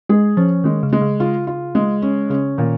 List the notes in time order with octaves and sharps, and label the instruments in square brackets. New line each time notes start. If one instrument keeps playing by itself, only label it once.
[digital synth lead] G#3 [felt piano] G#4
[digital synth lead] F3 [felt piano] C#4
[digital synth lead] D#3 [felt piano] G#3
[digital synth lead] C#3
[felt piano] G#3
[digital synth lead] C#3
[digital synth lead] C#3 [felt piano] F4
[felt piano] F4
G#3
C#4
[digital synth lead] C#3 [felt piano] C#4
[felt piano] A#2 [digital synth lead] D#3